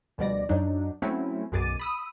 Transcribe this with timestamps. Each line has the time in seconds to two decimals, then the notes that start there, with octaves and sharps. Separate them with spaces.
0.18 D2 B2 F3 G3 D5 A#6
0.49 F#2 F#3 D4 D#4
1.02 F#3 A3 C4 C#4 E4
1.52 B1 F#2 G#4 D6 A6 D#7
1.80 B5 D#6 E6